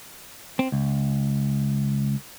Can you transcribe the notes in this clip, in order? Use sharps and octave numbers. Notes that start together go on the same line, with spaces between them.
C4
C#2